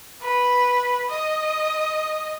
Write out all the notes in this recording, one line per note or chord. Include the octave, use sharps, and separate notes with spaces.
B4
D#5